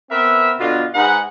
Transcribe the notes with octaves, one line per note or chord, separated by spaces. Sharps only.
B3 C4 A#4 B4 E5
B2 D3 F4
G#2 D#4 B4 F#5